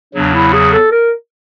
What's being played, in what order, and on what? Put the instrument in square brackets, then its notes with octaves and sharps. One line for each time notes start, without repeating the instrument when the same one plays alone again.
[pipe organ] E2 C#3 F#3 [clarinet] D4
[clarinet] E4
G#4
A4
A#4